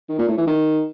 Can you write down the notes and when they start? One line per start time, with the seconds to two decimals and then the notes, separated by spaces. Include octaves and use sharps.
0.09 D#3
0.19 A#2
0.28 A2
0.38 E3
0.47 D#3